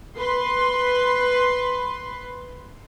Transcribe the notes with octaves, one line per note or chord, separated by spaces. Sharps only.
B4 C6